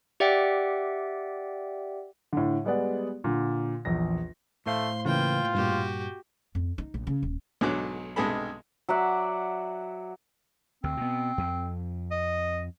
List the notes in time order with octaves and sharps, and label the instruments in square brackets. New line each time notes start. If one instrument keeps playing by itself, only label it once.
[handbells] G4 D5 E5 F#5 G5
[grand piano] A2 D3
G3 G#3 B3 G#4 D5 F#5
A#2 D3
A#1 E2 A#6
[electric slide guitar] A2 C5 F5 [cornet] A3 [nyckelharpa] C6
[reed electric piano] C#3 E3 B4 [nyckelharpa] A#3 G5 [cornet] F4
[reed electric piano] G2 A#2 [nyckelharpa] F#4 G4
[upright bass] F2
D#4
A#1
C#3
D#1
[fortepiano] B1 G#2 D3 F#3 D6 F#6
B1 G2 C3 G#3 A4 B5
[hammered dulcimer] F#3 D5 E5 F#5
[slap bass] D2 [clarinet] C4
[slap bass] B2 B3
F2
[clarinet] D#5